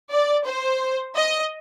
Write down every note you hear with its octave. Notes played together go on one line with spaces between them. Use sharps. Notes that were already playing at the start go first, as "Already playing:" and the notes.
D5
C5
D#5